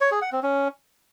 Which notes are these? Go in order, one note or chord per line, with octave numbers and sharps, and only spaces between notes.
C#5
G#4
F#5
C4
C#4